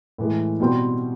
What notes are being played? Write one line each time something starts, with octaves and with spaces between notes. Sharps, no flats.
A2 E3 G#3
B2 G3 C4